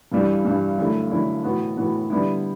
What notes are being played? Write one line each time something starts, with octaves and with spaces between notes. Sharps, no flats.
G2 E3 G3
G2 E3 G3
F#2 D3 A3 E4
F#2 D3 A3 E4
A2 E3 B3 F#4
A2 E3 B3 F#4
D3 G3 B3 E4